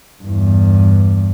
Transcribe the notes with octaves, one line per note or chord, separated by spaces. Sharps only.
E2 G2